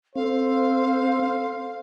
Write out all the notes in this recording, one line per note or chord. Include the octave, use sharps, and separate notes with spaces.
C4 A4 C5 F5